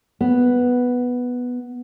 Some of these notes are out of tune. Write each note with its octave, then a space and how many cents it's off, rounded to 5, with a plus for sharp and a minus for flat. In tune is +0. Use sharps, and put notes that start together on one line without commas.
B3 +0